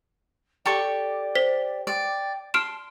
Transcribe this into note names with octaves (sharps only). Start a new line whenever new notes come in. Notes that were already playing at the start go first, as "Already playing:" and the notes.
G4 A4 D5 C#6
C5 B6
D5 G5
A5 C6 F6 D7 E7